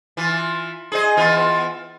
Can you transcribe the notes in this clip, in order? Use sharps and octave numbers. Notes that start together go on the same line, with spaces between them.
E3 F4
G#4 C5 D#5
E3 B3 F4